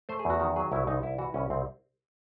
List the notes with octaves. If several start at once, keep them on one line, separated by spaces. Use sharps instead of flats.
A3 C5
G#4
E2 F#4
D#3 F#4
F#3 G#4
C2 E4
C2 D#4
C2 E4
E3 F#4
C2 C#4
C2 C4